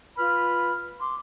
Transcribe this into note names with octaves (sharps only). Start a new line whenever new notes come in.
F4 B4 B5 F6
C6 D6